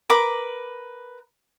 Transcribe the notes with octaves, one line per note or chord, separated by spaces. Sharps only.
A#4 B4 B5 D6